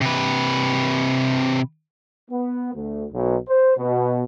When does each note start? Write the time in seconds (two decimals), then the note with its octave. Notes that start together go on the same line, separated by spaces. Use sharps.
0.01 C3 B4
2.31 B3
2.74 D2
3.12 B1
3.48 C5
3.77 B2